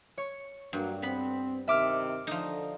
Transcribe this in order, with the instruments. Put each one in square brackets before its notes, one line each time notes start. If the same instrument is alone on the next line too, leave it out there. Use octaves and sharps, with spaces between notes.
[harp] C#5
[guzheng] G2 [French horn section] F#3 A#3
[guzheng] B3 B5 [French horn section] C4
[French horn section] C3 D#3 [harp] E5 D6 F6
[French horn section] D3 [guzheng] F3 D#4